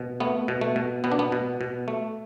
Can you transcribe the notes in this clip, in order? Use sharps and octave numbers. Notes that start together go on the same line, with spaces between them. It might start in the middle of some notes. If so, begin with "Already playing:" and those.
Already playing: B2
A3 B3
B2
A3
B2
B2 B3
D4
B3
B2
B2
A3